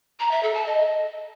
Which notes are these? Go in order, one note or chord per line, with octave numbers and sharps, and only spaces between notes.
A#5
E5
A4
A5
D#5